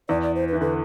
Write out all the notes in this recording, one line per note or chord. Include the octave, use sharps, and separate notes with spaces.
E2 E3 D5
D5
C5
B4
E3
D3 B4